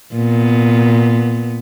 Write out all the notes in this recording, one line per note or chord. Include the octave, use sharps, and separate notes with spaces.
A#2 B3